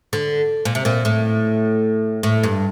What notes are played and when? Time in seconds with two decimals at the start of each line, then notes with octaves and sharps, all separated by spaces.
0.13 D3
0.65 A#2
0.75 C3
0.85 A#2
1.05 A2
2.23 A2
2.43 G2